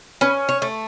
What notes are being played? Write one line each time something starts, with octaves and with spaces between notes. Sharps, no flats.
C#4 B4
C#5
A3